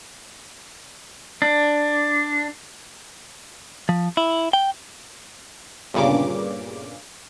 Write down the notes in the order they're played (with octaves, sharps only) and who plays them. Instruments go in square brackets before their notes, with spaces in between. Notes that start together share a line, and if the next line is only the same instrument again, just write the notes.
[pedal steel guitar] D4
[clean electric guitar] F3
E4
G5
[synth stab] G1 G2 A#2 C#3 D6